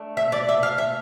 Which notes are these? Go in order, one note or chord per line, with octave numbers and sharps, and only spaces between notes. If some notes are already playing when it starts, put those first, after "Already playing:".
Already playing: A3 D4
E5
D5
E5
F5
E5